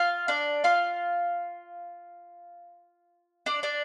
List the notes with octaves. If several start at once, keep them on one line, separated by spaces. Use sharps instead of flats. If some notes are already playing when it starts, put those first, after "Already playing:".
Already playing: F4 F5
D4 D5
F4 F5
D4 D5
D4 D5